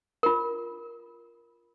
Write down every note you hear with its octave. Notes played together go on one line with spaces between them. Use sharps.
F4 A#4